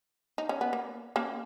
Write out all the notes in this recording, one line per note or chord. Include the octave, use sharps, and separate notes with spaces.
D#4
C#4
B3
A#3
A#3 C#4